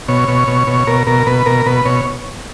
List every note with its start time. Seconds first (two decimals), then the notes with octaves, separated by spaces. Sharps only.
0.08 B2 C#5
0.28 B2
0.48 B2
0.67 B2
0.87 B2 A#4
1.07 B2 A#4
1.27 B2 B4
1.46 B2 A#4
1.66 B2 B4
1.85 B2 C#5